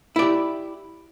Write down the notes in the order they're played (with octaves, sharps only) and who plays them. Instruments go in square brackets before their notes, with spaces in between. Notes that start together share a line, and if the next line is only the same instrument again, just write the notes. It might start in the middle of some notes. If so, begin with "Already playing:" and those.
[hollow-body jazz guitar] E4
D5
G4